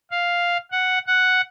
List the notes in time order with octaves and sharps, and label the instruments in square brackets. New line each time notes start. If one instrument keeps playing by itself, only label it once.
[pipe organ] F5
F#5
F#5